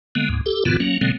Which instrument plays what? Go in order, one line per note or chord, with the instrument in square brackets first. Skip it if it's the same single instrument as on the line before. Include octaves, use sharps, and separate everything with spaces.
[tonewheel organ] D3 G#3 A#3 B3
D2 G#2
G4 A4
G2 A#2 D3 E3 B3 F4
F#3 A#3 C#4
B2 D3 F#3 G#3 A#3 C4